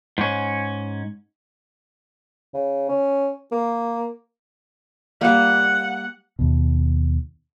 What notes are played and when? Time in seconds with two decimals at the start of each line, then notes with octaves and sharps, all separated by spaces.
0.18 G#2 C#4
2.54 C#3
2.89 C#4
3.52 A#3
5.21 G3 A#3 F#5
6.39 D#2 B2